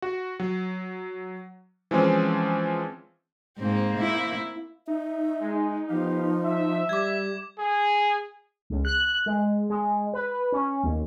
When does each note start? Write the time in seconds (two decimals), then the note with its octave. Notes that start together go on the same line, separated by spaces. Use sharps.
0.02 F#4
0.40 F#3
1.91 E3 F3 G#3 C4 C#4
3.58 G#2 A#3 C4
3.98 E4
4.88 D#4 E5
5.41 G#3
5.90 F3 B3 G4 F5
6.44 E5
6.89 G3 D6 G#6
7.59 G#4
8.70 C#2
8.85 F#6
9.26 G#3
9.70 G#3
10.14 B4
10.52 C#4
10.83 D#2